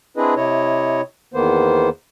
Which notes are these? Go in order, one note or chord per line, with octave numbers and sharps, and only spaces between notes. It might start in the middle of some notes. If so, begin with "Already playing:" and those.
C4 D4 E4 G#4 B4 D#5
C3 E4 C#5 D#5
E2 D#3 A#3 B3 C5